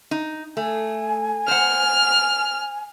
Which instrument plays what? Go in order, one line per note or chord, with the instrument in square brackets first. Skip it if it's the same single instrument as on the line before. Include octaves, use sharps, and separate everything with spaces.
[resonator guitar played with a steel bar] D#4
[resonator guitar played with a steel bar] A3 [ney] G#5
[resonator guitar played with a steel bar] C5 F#5 [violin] F6